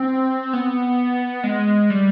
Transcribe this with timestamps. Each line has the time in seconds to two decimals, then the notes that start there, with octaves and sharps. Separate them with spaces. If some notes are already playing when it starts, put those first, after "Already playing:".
Already playing: C4
0.53 B3
1.44 G#3
1.90 G3